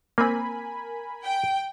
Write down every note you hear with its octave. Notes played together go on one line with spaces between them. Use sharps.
A#3 C4 A#4 G#5 B5
G5